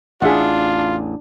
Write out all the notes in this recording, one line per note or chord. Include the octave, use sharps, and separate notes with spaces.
A1 E2 D4 F4 G#4 E5 F#5